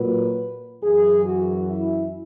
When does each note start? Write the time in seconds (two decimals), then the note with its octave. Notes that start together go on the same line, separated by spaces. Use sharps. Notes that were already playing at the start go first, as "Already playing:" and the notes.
Already playing: A#2 F#3 B4
0.83 F#2 E3 G#4
1.25 F#4
1.69 E4